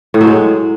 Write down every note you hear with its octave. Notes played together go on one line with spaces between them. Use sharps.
A2
F#3
G#3